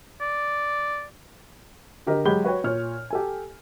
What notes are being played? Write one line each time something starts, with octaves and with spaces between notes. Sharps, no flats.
D5
D3 G4 A#4 D#5
F#3 G#3 G4 B5 G6 G7
F#4 B4 C#5 G5
A#2 C#5 F6
G4 A4 G#5